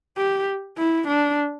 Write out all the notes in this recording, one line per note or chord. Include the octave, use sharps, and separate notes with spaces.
G4
E4
D4